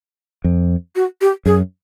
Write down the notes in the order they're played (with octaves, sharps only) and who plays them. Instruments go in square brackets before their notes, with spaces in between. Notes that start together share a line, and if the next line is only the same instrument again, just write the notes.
[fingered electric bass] F2
[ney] F#4
G4
[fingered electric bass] F#2 [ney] G#4